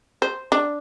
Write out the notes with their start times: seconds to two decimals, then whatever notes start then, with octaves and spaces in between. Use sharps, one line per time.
0.22 C5
0.52 D4